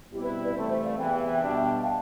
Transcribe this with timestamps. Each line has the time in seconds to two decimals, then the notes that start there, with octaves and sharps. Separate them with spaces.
0.11 B2 G3 C4 E4 G4
0.22 B4
0.43 B4 D5
0.54 C2 C3 E3 A3 C5 E5
0.68 C5 E5
0.82 D5 F5
0.97 E2 C3 E3 E5 G5
1.40 B2 G3 D4
1.82 F5 A5